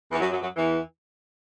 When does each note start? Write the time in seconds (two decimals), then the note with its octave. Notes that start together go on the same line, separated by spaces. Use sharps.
0.11 E2 E3
0.21 F#2 F#3
0.31 F#2 F#3
0.41 F#2 F#3
0.56 E2 E3